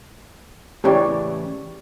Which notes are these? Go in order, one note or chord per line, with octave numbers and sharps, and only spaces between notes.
A2 C#3 E3 G4 C#5 D5